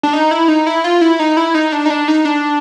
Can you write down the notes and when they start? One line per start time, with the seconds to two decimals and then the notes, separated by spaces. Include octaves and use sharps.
0.03 D4
0.13 D#4
0.31 E4
0.48 D#4
0.67 E4
0.84 F4
1.01 E4
1.19 D#4
1.37 E4
1.55 D#4
1.72 D4
1.86 D#4
1.90 D4
2.08 D#4
2.25 D4